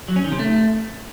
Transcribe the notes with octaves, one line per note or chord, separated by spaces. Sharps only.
F#3
C#4
D#3
C3
A3